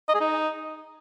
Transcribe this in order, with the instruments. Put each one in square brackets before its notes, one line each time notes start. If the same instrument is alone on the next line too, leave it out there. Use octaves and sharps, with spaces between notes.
[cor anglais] D#5
G#4
D#4